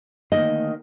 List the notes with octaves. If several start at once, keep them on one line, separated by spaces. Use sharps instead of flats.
D2 D#3 A#3 D#5